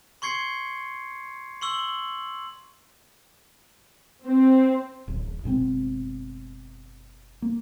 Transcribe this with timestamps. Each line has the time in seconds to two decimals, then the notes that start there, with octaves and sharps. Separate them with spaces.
0.22 C6 C#6 G#6 C7 C#7
1.62 C6 C#6 E6 F#7
4.26 C4
5.08 D1 A1
5.44 F#1 B2 G#3 C4
7.42 A#3